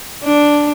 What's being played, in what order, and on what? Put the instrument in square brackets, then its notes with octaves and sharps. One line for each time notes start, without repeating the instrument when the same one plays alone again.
[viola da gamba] D4